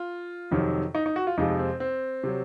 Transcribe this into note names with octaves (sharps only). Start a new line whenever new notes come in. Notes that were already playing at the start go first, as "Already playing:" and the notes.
Already playing: F4
F2 C3 D#3 F#3
D#4
D#4
F#4
F4
F2 C3 F3 G#3 D#4
C4
C4
C3 F#3